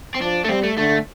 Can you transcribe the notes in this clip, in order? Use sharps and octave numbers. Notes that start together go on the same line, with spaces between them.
C4
F3 D4
A3
G3 C4
A3
D3 A3